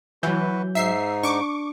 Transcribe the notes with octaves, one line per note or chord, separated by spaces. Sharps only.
E3 F#3 F#4 B4 G6
G#2 D#4 E5 C7
D4 C#6 D6